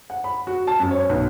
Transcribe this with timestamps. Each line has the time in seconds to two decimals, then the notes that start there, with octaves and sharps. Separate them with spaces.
0.10 F#5
0.24 B5
0.47 F#4
0.67 A5
0.79 F#2
0.91 C#5
1.09 B1